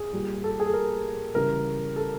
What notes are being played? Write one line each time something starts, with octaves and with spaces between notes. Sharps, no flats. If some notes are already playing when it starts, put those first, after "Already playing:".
Already playing: G#4
A#2 G3
A4
G#4
A4
A#4
C#3 E3 G3 A#4
A4